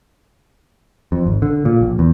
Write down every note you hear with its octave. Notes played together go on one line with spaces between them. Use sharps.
F2
G#1
D3
A#2
A#1
E2